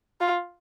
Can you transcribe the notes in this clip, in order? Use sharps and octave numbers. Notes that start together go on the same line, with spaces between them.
F4